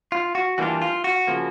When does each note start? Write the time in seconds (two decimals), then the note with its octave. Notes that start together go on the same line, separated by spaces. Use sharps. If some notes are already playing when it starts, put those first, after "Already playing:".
0.12 F4
0.35 F#4
0.58 E3 G3 A#3 D4 F4 F#4
0.82 F4
1.04 F#4
1.27 C#3 F3 A#3